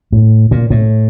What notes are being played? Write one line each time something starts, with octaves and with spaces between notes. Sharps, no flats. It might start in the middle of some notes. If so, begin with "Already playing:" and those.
A2
A#2
A2